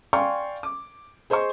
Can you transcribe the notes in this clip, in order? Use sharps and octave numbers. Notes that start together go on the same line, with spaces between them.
D5 F5 G5 G#5 C6 C#6
D6
G#4 C5 D#5 C6 C#6